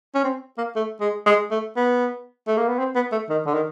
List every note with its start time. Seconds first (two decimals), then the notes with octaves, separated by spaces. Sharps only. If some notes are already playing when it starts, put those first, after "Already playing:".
0.15 C#4
0.24 C4
0.58 A#3
0.76 A3
1.01 G#3
1.26 G#3
1.51 A3
1.77 B3
2.47 A3
2.58 A#3
2.69 B3
2.79 C4
2.95 B3
3.12 A3
3.30 D#3
3.47 D3
3.54 D#3